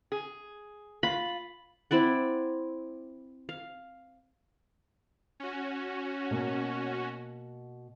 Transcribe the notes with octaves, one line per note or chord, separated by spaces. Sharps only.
G#4
F4 B5
C4 E4 D5 F#5
F5
C#4 F#4
B2 A#3